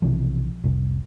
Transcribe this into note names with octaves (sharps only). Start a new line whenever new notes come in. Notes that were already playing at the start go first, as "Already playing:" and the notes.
B1 C3 E3 F3
F1 C2